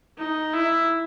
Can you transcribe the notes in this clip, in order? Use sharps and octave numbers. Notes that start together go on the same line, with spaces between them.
D#4
E4